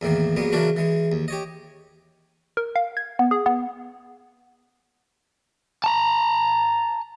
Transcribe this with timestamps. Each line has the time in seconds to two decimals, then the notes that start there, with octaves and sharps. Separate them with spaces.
0.01 E2 A2 D#3 A#3
0.36 G2 F#3 G#3 A#3 B3
0.52 C#3 E3 F#3 D4 F#4 A#4
0.76 E3 G#3
1.12 D#2
1.28 G4 C#5 D#5
2.57 A#4
2.76 F5
2.97 G#6
3.19 B3
3.31 G#4
3.46 B3
5.84 A5 A#5